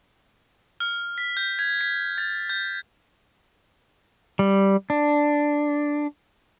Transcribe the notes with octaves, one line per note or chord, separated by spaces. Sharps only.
F6
B6
G6
G#6
B6
A6
G6
G3
D4